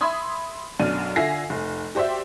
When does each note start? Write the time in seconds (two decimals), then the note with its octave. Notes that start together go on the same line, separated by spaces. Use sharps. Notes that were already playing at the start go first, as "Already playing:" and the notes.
0.01 E5 B5 C6 D#6 G#6
0.79 B1 F#2 D4 D#7
1.16 D3 F4 E5 G#5 A#6 C7
1.50 F1
1.95 F#4 G4 C5 D5 E5